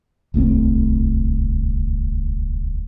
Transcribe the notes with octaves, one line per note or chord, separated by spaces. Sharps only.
D1 C2 A3 C4